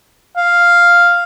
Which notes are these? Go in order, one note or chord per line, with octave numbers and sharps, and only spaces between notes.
F5